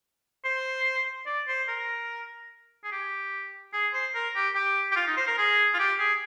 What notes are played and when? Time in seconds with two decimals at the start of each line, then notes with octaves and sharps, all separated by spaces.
0.45 C5
1.26 D5
1.48 C5
1.68 A#4
2.84 G#4
2.92 G4
3.73 G#4
3.93 C5
4.15 A#4
4.35 G4
4.55 G4
4.92 G4
4.96 F4
5.07 D#4
5.17 C5
5.27 A#4
5.38 G#4
5.74 F4
5.79 G4
5.99 G#4